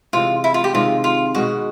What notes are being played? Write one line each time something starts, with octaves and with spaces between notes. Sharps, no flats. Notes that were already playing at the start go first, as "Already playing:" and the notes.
C3 E3 G#3 F4
E4
F4
G4
C3 D#3 G#3 C4 F4
F4
B2 G#3 B3 F#4